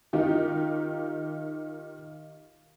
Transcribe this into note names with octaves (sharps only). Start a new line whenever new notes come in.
D#3 D#4 F4 G4